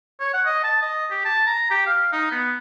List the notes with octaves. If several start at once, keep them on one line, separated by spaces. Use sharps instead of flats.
C#5
F#5
D#5
A5
D#5
G4
A5
A#5
G4
F5
D#4
B3